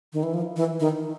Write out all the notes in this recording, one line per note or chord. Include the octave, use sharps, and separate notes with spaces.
D#3
E3
F3
E3
D#3